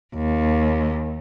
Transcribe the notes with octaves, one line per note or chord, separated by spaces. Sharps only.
D#2